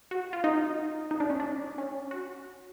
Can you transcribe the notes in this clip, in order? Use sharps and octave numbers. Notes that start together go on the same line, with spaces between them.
F#4
F4
D#4
D#4
D4
C#4
D4
C#4
F#4